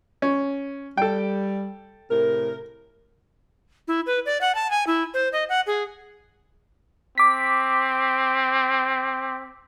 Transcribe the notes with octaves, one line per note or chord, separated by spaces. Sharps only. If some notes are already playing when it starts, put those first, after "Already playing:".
C#4
G3 A4 G5
A2 C3 A#4
E4
B4
D5
F#5
A5
G#5
E4
C5
D#5
F#5
G#4
C4 D6 B6